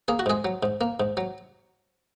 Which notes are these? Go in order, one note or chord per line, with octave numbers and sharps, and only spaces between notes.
A#3 G#4
F#4
G#2 G#3 G#4
F#3
G#2
A#3
G#2
F#3